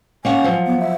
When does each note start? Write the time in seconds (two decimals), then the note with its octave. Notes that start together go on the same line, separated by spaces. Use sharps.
0.25 A#3 C#4 F#5 G#5
0.44 F3 F#3
0.66 B3
0.80 E5